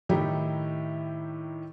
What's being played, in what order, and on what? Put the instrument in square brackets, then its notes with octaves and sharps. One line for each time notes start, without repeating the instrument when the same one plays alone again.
[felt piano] A2 D#3 D#4 E4 G4